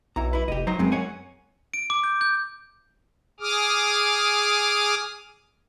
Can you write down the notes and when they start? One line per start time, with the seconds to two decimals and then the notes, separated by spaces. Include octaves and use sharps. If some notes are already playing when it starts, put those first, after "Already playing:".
0.16 B1 E4 A#5
0.33 E4 B4
0.48 F1 G4 D#5
0.67 F#3 D#4 C5 A#5
0.79 F#2 G#3 B3 C4
0.92 C#5 F#5 G#5
1.74 D7
1.90 D6
2.04 G6
2.21 G6
3.40 G#4 D6 D#6 F6